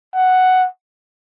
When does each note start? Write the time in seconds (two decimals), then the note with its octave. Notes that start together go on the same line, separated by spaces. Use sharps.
0.14 F#5